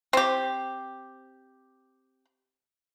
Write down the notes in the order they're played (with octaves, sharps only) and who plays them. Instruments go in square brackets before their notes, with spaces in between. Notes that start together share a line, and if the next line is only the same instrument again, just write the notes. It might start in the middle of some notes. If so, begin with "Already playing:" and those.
[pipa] C4 G4